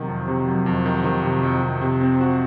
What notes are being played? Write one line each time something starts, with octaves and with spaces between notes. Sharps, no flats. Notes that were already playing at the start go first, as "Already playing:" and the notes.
Already playing: C3 D#3 F#3
F2
C3
F#3
F2
D#3
D#3
C3
F2
F2
C3
C4
F#4